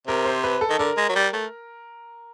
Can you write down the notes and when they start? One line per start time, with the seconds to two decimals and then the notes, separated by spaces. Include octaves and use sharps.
0.08 C3 A#4
0.25 C5
0.44 B4
0.61 A4
0.70 D#3
0.79 D3 A#4
0.97 G#3
1.09 F#3
1.16 G3
1.33 A3